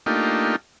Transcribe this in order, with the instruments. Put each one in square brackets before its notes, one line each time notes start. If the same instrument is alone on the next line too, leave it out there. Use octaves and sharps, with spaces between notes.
[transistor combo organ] A3 A#3 D4 D#4 F4 G4